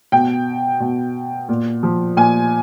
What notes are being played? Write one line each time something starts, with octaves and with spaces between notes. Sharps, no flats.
B2 G5
B2
A#2
F3
A#2 G#5